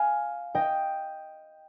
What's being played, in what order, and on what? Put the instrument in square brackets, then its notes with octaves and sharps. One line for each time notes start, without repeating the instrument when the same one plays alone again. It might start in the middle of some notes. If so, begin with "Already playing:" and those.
Already playing: [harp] F5 G#5
D#5 G5